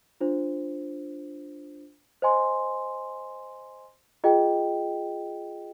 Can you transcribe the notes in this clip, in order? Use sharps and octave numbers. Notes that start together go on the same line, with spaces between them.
D4 F4 C5
C5 D#5 G#5 C6
F4 G#4 D#5 G5